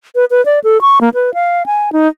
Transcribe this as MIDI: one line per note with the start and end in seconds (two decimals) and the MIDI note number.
0.15 0.25 71
0.31 0.44 71
0.45 0.59 74
0.64 0.81 69
0.81 0.99 85
1.01 1.09 58
1.14 1.33 71
1.34 1.66 77
1.66 1.93 80
1.93 2.08 63